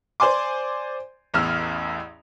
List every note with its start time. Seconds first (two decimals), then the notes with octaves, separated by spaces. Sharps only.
0.20 C5 D5 G#5 C6 D6
1.34 A1 E2 E6 F6